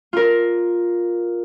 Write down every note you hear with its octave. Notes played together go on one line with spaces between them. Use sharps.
F4 A#4